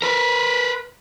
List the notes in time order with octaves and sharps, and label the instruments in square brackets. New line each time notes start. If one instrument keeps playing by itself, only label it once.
[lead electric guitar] A#4 B4